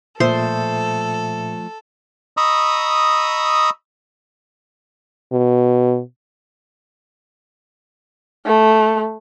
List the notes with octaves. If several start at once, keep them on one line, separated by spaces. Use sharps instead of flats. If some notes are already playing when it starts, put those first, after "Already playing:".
A#2 F3 A3 A4 C5 E5 C6 D#6
D#5 A#5 B5 C#6 D#6 E6
B2
A3